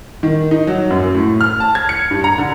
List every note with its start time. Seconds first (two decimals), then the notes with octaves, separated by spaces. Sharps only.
0.23 D#3
0.51 D#4
0.67 F#3
0.90 F#2
1.15 A2
1.41 F6
1.60 A5
1.75 G#6
1.89 C#7
2.11 G2
2.24 A#5
2.38 D3